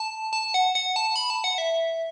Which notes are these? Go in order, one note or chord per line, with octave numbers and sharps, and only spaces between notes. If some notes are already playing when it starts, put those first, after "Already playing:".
Already playing: A5
A5
F#5
F#5
A5
B5
A5
F#5
E5